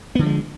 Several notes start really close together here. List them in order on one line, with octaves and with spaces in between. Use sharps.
B3 D3 F3 G#3